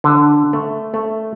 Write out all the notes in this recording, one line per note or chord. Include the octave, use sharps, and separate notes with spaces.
D3
A3
A3